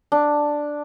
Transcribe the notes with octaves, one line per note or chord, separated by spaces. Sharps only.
D4